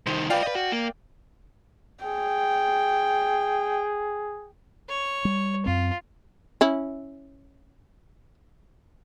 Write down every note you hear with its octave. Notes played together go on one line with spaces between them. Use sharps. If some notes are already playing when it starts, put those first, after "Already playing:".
C2 D#3 C5
F4 B4 D5 F5 G5
B4 D#5
F#4
A#3
G#4 G5
C#5
G3
F#2 C4 F4
C#4 E4